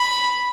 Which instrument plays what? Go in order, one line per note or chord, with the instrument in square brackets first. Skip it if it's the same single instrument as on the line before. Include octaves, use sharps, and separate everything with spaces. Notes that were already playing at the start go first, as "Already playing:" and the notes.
Already playing: [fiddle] B5